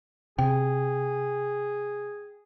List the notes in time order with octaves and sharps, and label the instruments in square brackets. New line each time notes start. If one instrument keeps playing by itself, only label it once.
[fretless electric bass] C3 [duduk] G#4 [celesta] G5